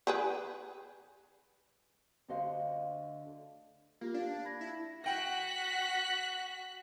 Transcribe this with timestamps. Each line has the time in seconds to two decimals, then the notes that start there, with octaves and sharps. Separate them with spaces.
0.07 G4 G#4 B4
2.28 D2 D3 F#4 C5 D#5 F5
4.01 A#3 F4 G4
4.14 D4 F5
4.45 B5 G#6 A#6
4.61 E4
5.04 F#4 F#5 G5 F#6 A#6 B6